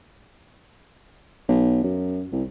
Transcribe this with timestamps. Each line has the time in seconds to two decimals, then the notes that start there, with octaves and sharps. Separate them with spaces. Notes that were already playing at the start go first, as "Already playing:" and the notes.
1.49 B1
1.83 F#2
2.32 C2